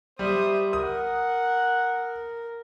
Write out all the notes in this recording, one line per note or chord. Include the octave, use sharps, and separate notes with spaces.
G3 C5 E5 D#6
A#4 F#5 D#6